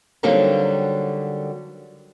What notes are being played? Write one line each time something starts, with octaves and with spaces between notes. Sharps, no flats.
D3 F#3 G3 A#3 C4 D#4